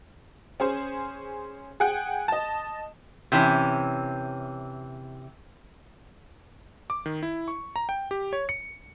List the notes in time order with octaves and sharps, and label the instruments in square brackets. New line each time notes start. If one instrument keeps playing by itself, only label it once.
[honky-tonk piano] C#4 G#4 C5
G#4 F#5 G5
D#5 A5
[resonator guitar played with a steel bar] C3 E3 C#4
[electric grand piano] D6
D#3
E4
C#6
A#5
G5
G4
C#5
C#7